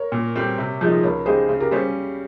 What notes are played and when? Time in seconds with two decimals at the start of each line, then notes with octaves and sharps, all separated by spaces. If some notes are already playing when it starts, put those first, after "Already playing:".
Already playing: A#4 C#5
0.12 A#2
0.36 G3 C4
0.58 C3
0.81 F3 G#3 D#4
1.03 C#2 A#4 C#5
1.26 C#3 G#3 D#4 G4 G#4 C5
1.49 C#3
1.60 G4 A#4
1.71 G3 C#4 G#4 C5